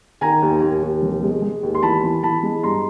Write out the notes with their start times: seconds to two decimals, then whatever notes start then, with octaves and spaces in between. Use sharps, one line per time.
0.21 D#3 G#5 A#5
0.42 D#2
0.62 D#2
0.82 D#2
1.02 F1
1.22 G#3
1.42 G#3
1.63 D#2
1.75 C6
1.83 E3 A5 B5
2.04 E3
2.23 E3 A5 B5
2.43 G#3
2.63 G2 A#5 C6